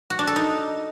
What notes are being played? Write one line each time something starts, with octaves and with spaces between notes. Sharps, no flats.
F#4
D4
A4
D#4